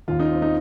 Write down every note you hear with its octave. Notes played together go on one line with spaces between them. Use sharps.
D#2 D#3 F4
D#4
C4
D#4